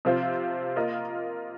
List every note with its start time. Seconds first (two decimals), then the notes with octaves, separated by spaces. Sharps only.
0.05 C3 F3 C4 F4 C5
0.76 A#3 F4 A#4 D#5